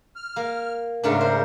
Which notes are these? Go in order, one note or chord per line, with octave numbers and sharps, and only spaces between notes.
F6
A#3
G#2 C#3 A3 D4 A#4
C5